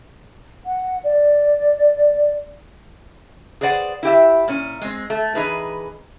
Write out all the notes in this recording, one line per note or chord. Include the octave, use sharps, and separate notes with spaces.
F#5
D5
G#4 B4 C5 D5 F#5
E4 G4 E5
A#2 C#4
G#3 C4
A3
E3 D#4 G#4 B4